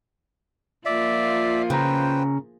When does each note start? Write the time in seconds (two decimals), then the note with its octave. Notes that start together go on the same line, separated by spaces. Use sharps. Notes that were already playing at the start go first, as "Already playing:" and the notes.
0.85 F3 A#3 F4 D5 E5
1.70 C#3 C#4 B4 C5 G5 A#5